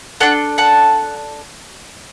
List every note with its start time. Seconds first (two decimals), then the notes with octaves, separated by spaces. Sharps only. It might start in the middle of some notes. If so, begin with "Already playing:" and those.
0.20 D4 A4 F#5 A5
0.58 F#5 A5